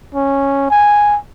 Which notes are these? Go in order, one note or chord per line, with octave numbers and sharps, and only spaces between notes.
C#4
G#5